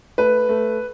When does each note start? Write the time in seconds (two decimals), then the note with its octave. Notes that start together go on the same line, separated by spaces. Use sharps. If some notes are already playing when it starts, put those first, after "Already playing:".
0.18 A3 B4
0.49 A3